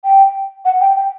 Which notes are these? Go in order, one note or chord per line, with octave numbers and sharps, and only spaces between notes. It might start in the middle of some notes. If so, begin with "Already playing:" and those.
G5
F#5
G5
G5